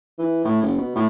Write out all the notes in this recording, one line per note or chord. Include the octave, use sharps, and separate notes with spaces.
E3
A2
F#1
B2
A2